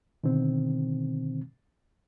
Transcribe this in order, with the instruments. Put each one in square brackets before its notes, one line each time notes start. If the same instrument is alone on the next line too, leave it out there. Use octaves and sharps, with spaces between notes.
[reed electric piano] B2 D3 D#3 C4